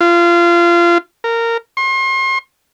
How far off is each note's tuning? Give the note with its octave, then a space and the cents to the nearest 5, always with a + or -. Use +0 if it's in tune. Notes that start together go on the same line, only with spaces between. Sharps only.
F4 -25
A#4 -15
C6 +40